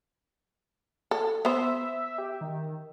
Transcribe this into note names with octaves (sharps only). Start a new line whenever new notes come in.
A4
B3 C5 E5
G4
D#3